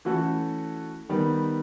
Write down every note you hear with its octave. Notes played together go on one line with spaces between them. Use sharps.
E3 A3 C#4 F#4 A4
D#3 G3 B3